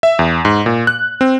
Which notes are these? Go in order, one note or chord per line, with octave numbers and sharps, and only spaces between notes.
E5
E2
G#2
A#2
F#6
C4